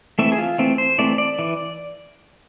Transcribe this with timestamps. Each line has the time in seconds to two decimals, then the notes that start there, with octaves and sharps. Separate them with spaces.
0.19 E3 A3 C4 E5
0.32 G#4
0.38 F4
0.58 E3 A3 C4
0.78 C5
0.98 E3 A3 C4 D5
1.18 D5
1.39 E3